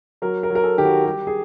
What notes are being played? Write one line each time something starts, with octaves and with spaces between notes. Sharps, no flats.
F#3 A#4
A#4
F#3
A#4
A4
D#3 G4
F#4
G3 G4
G#4